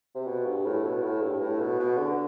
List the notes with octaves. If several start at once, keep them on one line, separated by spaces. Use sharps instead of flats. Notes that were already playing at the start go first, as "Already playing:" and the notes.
C3
B2
G2
A2
B2
A2
G2
A2
B2
B2
D3